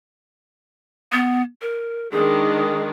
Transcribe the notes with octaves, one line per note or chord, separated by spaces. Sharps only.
B3
A#4
D#3 G#3 D4 G#4